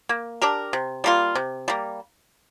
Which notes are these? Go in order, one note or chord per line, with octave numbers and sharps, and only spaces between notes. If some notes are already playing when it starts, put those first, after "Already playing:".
A#3
D4 G4 A#4
C3
G3 A#3 F4
C3
G3 A#3